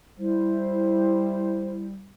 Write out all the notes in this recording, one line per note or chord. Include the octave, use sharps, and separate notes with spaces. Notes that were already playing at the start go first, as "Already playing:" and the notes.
G3 E4 C5